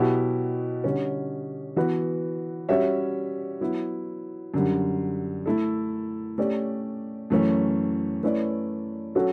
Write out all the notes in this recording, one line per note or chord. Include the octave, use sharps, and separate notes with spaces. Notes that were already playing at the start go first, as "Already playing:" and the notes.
Already playing: B2 F#3 B3 E4 G4
D3 G3 C#4
E3 B3 F#4 B4
G3 C#4 F#4 C#5 E5
F#3 B3 E4
F#2 D3 G3
A3 E4 A4
A3 C#4 G4 D5
F#2 E3 A3 C#4
A3 C#4 E4 B4 D5
F#3 C#4 F#4 A4